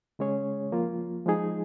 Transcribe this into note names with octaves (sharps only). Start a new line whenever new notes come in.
C#3 G#3 C#4 G#4 C#5
F3 A#3 F4
F3 G#3 D#4 G#4